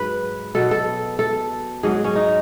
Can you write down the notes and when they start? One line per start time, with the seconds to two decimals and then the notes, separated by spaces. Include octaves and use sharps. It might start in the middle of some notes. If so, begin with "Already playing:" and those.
Already playing: G#2 F#3 B4
0.55 B2 F#3 A4
0.71 A4
1.19 A4
1.83 G#2 F#3 G#4
2.04 C#4
2.15 D#4